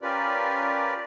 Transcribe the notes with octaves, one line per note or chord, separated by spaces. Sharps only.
C#4 F4 G4 A#4 B4 D5